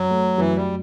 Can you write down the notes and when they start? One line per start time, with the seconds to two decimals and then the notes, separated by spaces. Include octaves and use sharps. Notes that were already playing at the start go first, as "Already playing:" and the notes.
Already playing: F#2 F#3
0.10 A3
0.38 F#2 E3
0.56 G3